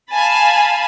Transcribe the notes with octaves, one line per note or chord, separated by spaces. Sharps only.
F5 G#5 A5 B5